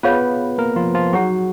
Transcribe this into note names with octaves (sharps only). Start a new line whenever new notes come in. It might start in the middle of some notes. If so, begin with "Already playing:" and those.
B3 F4 G#4 B4 C#5 F5
A#3 A#4
F3 F4
F3 F4
F#3 D#4 F#4 G#4 C#5 F#5 A#5